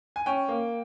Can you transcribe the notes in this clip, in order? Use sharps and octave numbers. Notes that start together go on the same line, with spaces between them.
G#5
C#4 G5
A#3